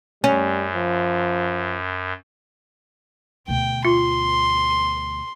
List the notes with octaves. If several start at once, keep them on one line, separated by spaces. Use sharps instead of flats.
F#2 G3 C#4
F3
D2 B2 G5
F4 C6